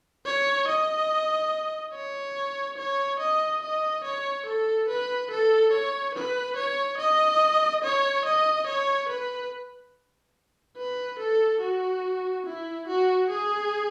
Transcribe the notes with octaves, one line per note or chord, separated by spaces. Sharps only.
C#5
D#5
C#5
C#5
D#5
D#5
C#5
A4
B4
A4
C#5
B4
C#5
D#5
C#5
D#5
C#5
B4
B4
A4
F#4
E4
F#4
G#4